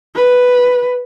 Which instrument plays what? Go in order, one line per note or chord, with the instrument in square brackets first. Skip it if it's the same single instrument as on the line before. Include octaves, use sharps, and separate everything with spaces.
[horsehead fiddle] B4